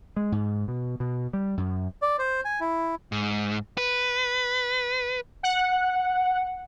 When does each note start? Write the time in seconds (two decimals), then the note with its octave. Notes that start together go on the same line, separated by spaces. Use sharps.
0.16 G#3
0.32 G#2
0.68 B2
1.00 B2
1.33 G3
1.57 F#2
2.02 D5
2.19 C5
2.45 G#5
2.60 E4
3.12 G#2
3.77 B4
5.43 F#5